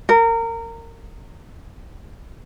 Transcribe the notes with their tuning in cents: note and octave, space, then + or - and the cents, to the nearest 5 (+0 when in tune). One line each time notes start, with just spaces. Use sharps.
A#4 -25